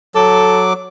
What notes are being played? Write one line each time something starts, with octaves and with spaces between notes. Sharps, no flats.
F#3 A4 D6